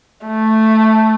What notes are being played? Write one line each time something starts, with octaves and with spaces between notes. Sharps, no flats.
A3